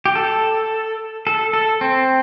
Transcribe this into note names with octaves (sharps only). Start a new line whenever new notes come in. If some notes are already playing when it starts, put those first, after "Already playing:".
G4
A4
A4
A4
C4